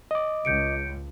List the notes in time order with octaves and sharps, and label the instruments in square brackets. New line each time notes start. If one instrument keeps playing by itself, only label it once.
[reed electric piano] D#5 D6
[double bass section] C#2 [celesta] G6 C#7 D7